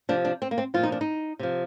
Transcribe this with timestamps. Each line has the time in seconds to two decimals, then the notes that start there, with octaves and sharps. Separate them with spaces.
0.09 C3 F3 D4
0.25 D4
0.42 C4
0.51 A#3
0.58 C4
0.74 A#2 F3 F4
0.83 D#4
0.92 D4
1.01 D#4
1.39 C3 F3